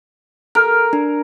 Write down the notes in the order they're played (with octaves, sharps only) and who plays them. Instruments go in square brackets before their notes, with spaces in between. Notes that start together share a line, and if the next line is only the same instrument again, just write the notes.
[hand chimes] A4 F6 [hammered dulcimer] A#4
[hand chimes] D4